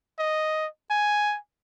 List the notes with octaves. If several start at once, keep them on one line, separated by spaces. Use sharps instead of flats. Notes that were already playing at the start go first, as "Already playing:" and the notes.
D#5
G#5